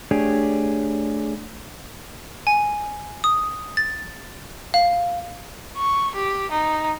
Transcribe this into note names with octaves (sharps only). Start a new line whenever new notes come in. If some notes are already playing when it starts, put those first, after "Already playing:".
A3 D4 G4 G#4 C#5 D5
G#5
D#6
A6
F5
C#6
G4
D#4